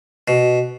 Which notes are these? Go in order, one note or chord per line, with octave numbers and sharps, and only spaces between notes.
B2